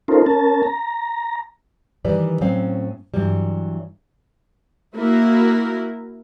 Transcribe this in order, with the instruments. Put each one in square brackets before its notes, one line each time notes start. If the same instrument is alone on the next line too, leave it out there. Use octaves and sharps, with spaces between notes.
[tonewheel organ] C#4 D#4 F4 A4 A#4 C5
C#4 A#4 A5
A#5
[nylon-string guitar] D#3 E3 G3 B4 D5
A2 F#3 C4 C#4 F5
G2 E3 F#3 G3
[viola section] A#3 E4 F#4 A#4